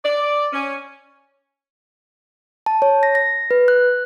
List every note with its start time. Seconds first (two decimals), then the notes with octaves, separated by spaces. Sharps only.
0.04 D5
0.53 C#4
2.66 A5
2.82 C#5
3.03 A#6
3.15 A#6
3.51 B4
3.68 F#6